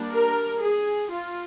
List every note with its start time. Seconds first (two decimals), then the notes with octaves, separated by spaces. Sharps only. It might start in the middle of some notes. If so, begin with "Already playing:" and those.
Already playing: G3 A#3 D4
0.10 A#4
0.60 G#4
1.10 F4